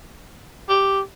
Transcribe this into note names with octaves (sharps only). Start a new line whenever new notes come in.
G4